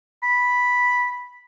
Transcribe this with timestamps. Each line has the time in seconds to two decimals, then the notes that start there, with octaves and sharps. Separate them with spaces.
0.23 B5